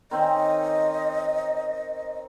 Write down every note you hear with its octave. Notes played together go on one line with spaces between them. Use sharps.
D#3 C4 C#4 D#5